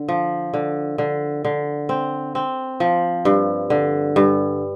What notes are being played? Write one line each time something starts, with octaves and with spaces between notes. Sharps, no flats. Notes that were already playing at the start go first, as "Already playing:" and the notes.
Already playing: D3
F3
D3
D3
D3
C4
C4
F3
G2
D3
G2